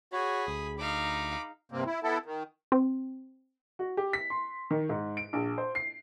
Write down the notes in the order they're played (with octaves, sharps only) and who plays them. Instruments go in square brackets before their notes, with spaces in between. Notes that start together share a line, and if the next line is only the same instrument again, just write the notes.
[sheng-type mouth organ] F#4 C#5 [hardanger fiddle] G#4 B5
[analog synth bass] D2 [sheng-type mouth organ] D#6
[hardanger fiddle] D#4 F5 [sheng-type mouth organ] B5 D6
[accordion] G2 C3 A#3 C4
E4
B3 E4 A4
D#3
[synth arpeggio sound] C4
[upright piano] F#4
G4
B6
C6
D#3
G#2
D7
A#1
C5
C7